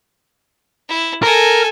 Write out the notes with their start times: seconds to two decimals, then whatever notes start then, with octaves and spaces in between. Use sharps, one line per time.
0.89 E4
1.23 A4 A#4 G#5